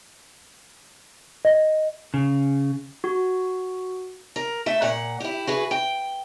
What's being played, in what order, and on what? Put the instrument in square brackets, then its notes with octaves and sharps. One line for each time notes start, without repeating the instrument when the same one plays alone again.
[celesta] D#5
[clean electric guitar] C#3
[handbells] F#4
[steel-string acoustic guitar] A#4
A3 E5
A#2 F#5
E4 G4
F#4 G#4 B4
G5